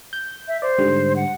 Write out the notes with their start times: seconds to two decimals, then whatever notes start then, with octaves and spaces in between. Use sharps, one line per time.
0.13 G6
0.48 E5
0.62 C5 D5
0.78 G#2 D3 G3
1.16 F#5